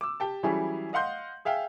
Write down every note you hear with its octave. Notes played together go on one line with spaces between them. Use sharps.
D6 E6
G4 G5 A5
E3 F#3 G3 C#4 E4 G#4
D#5 F5 F#5 C6 G6
G#4 E5 F5 G5